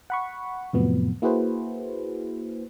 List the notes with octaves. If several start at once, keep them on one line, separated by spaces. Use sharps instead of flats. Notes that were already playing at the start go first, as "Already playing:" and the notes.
F#5 B5 C#6
F2 A2 C3 F3 F#3 B3
A#3 E4 F#4 G#4 B4 C5